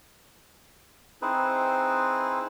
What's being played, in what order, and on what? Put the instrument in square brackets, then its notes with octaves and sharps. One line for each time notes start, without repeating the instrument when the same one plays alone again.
[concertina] C4 D#4 E4 G#4 B4 C5